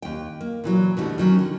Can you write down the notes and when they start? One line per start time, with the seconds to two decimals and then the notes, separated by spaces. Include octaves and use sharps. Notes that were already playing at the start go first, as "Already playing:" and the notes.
0.02 D#2 G5
0.41 A#3
0.64 A#2 E3 F#3
0.97 B2 D3 E3 G3 A3
1.18 D#3 F#3 C#4
1.39 D3